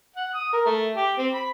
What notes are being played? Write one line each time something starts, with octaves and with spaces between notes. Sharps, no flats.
F#5
D#6
A#4
A3
G4
C4
B5